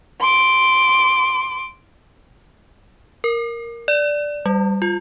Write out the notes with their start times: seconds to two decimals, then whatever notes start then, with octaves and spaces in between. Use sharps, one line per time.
0.21 C6 D6
3.24 A#4
3.88 D5
4.46 G3
4.82 F4